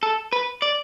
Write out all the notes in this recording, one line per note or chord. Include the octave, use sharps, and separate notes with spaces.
A4
B4
D5